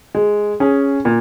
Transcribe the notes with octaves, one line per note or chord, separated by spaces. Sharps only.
G#3
C#4 G#4
A#2